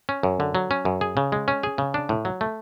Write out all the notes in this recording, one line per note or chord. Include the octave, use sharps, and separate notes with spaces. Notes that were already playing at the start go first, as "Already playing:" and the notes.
C#4
F#2
D3
F#3
C#4
F#2
G#4
C#3
G#3
C#4
G#4
C#3
D4
A2
F#3
A3